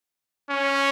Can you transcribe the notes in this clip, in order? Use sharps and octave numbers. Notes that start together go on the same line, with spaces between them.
C#4